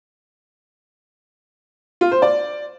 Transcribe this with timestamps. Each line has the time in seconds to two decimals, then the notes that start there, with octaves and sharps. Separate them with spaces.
2.01 F4
2.12 C5
2.22 D5